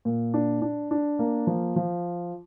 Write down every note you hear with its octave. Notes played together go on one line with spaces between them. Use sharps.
A#2
D4
D4
D4
A#3
F3
F3